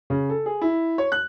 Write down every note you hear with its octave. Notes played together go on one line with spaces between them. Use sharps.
C#3
A4
G#4
E4
C#5
F#6